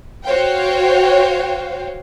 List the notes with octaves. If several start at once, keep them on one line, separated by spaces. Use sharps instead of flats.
F#4 C5 C#5 F5 G5